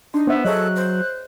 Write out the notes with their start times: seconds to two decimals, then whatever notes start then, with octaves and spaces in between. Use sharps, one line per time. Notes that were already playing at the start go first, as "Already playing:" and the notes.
0.14 D4 D#4 C6
0.27 B3 C5 E5
0.45 F#3 G#4 A4 C#5 D#5 F#6
0.76 C5